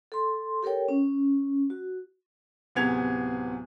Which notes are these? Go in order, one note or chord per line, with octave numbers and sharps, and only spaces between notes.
A4 C6
G4 A4 A#4 C#5 G5
C#4
F#4
D1 C3 B3 G#4 G#6 F7